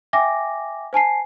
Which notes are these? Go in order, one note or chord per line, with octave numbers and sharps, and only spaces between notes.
E5 G5 G#5 D6 A#6
C5 G#5 A5 C7